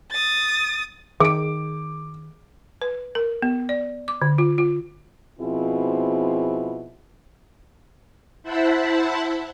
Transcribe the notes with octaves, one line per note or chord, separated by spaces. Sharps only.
D#6 A6
D#3 G#4 D6 D7
B4
A#4
B3
D5
D6
D3
F4
F4
B2 F3 C4 E4 F4 G#4
E4 C5 E5 F#5 A5 B5